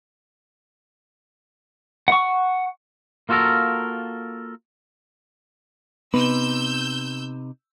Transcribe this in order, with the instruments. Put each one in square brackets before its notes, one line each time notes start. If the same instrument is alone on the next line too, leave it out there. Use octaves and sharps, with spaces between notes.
[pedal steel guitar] F#5 C#6
[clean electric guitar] A#3 F4 F#4 A4 A#4
[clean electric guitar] C3 D#4 B4 [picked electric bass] B3 [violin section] E6 G6